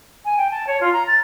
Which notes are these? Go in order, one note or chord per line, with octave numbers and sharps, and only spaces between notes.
G#5
G5
A5
C#5
F4
A#5
A6